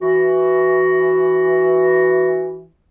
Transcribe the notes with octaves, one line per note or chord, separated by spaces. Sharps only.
E3 F#4